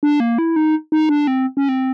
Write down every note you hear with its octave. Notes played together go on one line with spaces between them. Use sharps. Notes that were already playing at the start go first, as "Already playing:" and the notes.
D4
A#3
E4
D#4
D#4
D4
C4
C#4
C4